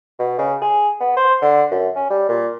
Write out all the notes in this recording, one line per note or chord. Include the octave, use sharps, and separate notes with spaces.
B2
C#3
G#4
B3
C5
D3
F#2
C#4
G3
A#2